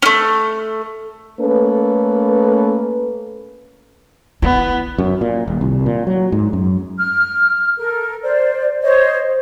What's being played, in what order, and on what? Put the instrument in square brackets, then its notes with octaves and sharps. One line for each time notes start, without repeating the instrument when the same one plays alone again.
[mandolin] A3 C#4
[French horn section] A3 A#3 C#4 A4 B4
[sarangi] B3 [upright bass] E4
[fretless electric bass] F#2
A#2
D#1
C2
A#2
F#3
G#2
F#2
[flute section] F6
A4 A#4
C5 D5
C5 C#5 D#5